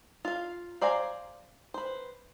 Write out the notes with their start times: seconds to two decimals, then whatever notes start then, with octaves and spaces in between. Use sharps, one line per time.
0.25 F4 F5
0.81 C5 D5 F5 G#5 A#5
1.74 B4 C5